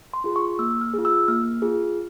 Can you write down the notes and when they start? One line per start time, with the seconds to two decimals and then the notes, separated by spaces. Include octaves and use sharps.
0.14 C6
0.24 F4 G#4
0.36 C#6
0.59 A#3 E6
0.81 F6
0.94 F4 G#4
1.05 E6
1.28 A#3 F6
1.62 F4 G#4